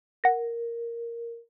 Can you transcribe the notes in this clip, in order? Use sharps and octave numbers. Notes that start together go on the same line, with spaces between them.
A#4 F#5 A#6